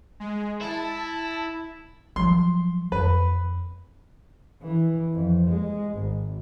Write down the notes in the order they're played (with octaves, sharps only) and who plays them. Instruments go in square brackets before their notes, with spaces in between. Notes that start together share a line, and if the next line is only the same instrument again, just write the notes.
[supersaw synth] G#3
[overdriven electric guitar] E4 [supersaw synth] A5
[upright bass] F3 F#3 [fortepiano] C6
[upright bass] F2 [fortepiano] B4
[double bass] E3
F2
G#3
G#1